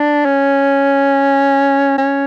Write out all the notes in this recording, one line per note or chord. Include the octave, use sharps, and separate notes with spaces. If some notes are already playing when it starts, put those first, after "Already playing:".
Already playing: D4
C#4
C#4